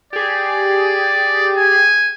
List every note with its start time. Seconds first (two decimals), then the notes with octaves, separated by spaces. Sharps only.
0.13 G4 G#4 D5
1.57 G#5